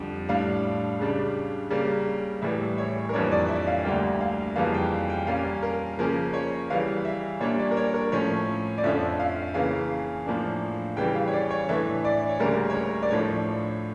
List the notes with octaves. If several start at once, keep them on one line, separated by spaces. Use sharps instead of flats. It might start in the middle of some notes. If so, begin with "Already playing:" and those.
Already playing: F2 D3 G3
A2 G3 D4 F5
C#2 C#3 G3 D4
C#3 G3 A#3
A2 E3 G3 E5
C#5
A#4
F2 E3 G3 A#3 D4 C#5
D5
E5
F5
D2 D3 G3 A#3 G5
F5
F2 C#3 E3 G3 A#3 F5
G5
G5
A#2 G3 A#3 C#4 F5
A#4
C#3 F3 A#3 C#4 A#4
C#5
C#3 E3 G3 F5
E5
A#2 G3 A#3 D4 C#5
D5
A#4
C#5
A#4
A2 F3 A3 C#4 C#5
D5
F2 D3 F3 A3 C#4 E5
F5
C#3 E3 A#3 F5
A2 F3 A#3 D4
C#3 E3 G3 G5
F5
C#5
D5
C#5
A2 E3 A3 D4 E5
D5
C#5
D2 C#3 G3 A#3 A#4
C#5
A#4
D5
A2 F3 A3 D4 C#5